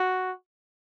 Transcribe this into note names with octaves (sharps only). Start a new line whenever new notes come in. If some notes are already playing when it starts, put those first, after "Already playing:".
Already playing: F#4